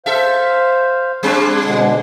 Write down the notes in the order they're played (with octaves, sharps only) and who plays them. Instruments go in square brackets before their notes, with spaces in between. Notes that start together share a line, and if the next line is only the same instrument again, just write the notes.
[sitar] A4 E5 [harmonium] C5 F5
[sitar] G3 C4 D4
[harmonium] B2 D3 G#3